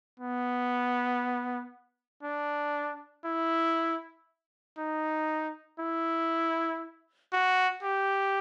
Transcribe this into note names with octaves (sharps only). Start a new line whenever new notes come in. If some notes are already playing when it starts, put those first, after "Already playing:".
B3
D4
E4
D#4
E4
F#4
G4